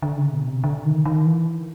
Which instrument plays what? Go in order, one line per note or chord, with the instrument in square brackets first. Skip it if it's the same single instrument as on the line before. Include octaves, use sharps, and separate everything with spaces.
[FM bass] D3
C#3
B2
C3
D3
D#3
D#3
E3